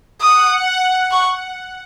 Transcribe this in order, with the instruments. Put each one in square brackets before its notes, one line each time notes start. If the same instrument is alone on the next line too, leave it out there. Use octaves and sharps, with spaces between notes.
[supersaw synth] F#5 [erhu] D#6
[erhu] C#6